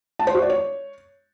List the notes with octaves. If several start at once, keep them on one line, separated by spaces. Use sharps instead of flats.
A5
C5
F#4
D5
C#5